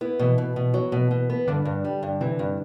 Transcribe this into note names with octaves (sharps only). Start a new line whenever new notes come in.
B3 E4
B2 E3 E4
B2
B2
F#3
B2
B2
B3
G2 D3 D4
G2
G3
G2
C3 E3 C4
G2